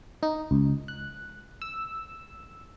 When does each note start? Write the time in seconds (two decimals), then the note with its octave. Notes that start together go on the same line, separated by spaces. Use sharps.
0.23 D#4
0.51 C#2
0.88 F#6
1.62 E6